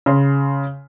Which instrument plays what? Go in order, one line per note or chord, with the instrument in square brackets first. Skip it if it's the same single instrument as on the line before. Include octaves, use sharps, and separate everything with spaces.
[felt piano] C#3 C6